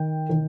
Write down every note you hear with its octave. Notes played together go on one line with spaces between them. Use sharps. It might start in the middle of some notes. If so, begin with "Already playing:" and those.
Already playing: D#3 G5
D#3